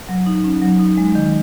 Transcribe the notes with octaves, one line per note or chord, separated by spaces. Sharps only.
F#3
D#4
C#4
F#3
D#4
G#3
D#3